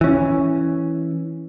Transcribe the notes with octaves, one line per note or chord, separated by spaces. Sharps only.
E3 C#4